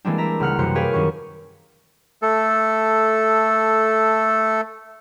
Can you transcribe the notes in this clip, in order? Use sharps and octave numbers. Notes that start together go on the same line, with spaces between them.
E3 G3 G#3 A#3 C4 D4
E5 A#5
C#2 C#3 F#5 F6 F#6 C#7
F#2 C3 E3 C5 C#7
G4 G#4 A#4 B4 C#5 F5
F#2 D#3 A#3 C#4 G4 C#6
A3 A4